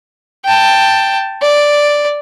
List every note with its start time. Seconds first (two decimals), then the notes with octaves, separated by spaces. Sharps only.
0.45 G5 A5
1.42 D5